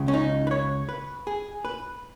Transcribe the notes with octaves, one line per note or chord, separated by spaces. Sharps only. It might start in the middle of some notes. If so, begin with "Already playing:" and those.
Already playing: C#2 C#3
C#4
D#4
B4
C#5
B4
G#4
B4